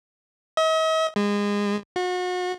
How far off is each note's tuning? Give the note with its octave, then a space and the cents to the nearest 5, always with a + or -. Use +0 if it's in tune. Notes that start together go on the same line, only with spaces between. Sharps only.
D#5 +45
G#3 -25
F#4 -35